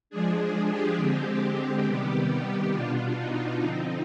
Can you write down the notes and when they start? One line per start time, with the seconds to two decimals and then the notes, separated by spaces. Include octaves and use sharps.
0.10 F3 G#3 D4 G#4
0.38 G#4
0.68 G4
0.97 D3 G#3 C4
1.85 C3 D#3 G3 B3
2.72 B2 B3 D4 F4
3.16 D#4
3.60 D3 F3 C4